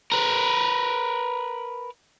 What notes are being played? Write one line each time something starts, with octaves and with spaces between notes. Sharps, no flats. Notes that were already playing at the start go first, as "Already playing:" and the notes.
A#4 B4